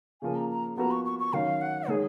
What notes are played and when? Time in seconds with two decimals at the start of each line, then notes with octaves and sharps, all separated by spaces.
0.22 C#3 F3 A#3 G#5
0.35 A#5
0.50 A#5
0.77 F3 B3 F#4 A#4 A#5
0.91 C#6
1.05 C#6
1.19 C#6
1.33 D#3 F#3 C#4 F5
1.61 F#5
1.88 D#3 G#3 D#4 G#4 A#4 C#5